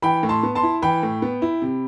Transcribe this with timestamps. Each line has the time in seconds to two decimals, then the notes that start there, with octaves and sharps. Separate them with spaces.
0.02 E3 G5 B5
0.23 A2
0.29 A5 C6
0.43 B3
0.55 A5 C6
0.63 E4
0.82 E3 G5 B5
1.03 A2
1.22 B3
1.42 E4
1.62 C3